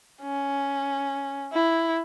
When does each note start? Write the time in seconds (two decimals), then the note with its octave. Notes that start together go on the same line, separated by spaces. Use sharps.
0.22 C#4
1.53 E4